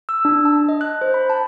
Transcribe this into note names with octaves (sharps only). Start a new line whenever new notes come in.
E6
D4
A5
D#5
F#6
C5
B5
A5